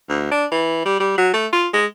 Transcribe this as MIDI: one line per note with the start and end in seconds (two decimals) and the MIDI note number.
0.09 0.28 38
0.31 0.46 62
0.52 0.83 52
0.85 0.98 55
1.00 1.15 55
1.18 1.31 54
1.34 1.47 57
1.53 1.68 65
1.73 1.86 56